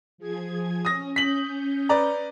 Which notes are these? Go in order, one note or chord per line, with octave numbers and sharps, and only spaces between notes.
F3 G#4 G#6
C#4 D#6 A#6
C#4 G6 B6 F#7
B4 D5 A#5